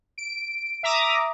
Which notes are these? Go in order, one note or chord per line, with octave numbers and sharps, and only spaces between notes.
D7
E5 A#5 D6 D#6